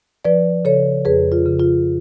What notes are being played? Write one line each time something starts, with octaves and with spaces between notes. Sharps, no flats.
F3 B4 D5
C#3 A4 C#5
F2 G#4 B4
F4
C#3
F4